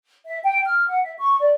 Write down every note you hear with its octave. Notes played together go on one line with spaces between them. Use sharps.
E5
G5
F6
F#5
E5
C#6
D5